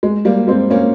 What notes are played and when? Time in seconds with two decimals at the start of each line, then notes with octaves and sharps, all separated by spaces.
0.03 G#3
0.25 G3 A#3
0.47 G#3 C4
0.70 A#3 C#4